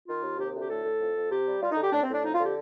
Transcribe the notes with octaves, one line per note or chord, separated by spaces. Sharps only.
D#3 F4
D#2
C3 G4
D2
G4
A2 A4
A2
F2
F2
C3 G4
G3
G3 F4
D#4
D3
G4
A2 D4
C4
A2 D4
F2 D#4
F4
D3
G4